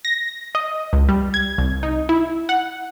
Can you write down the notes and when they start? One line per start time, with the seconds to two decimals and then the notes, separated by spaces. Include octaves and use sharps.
0.05 A#6
0.55 D#5
0.93 C#2
1.09 G3
1.34 G#6
1.58 C2
1.83 D#4
2.09 E4
2.49 F#5